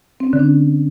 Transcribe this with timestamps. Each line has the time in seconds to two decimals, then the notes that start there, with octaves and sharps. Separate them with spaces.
0.20 C4
0.27 C#4
0.33 D3
0.39 D4